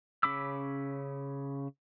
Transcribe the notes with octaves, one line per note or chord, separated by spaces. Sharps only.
C#3 C#4 B5 D6 E6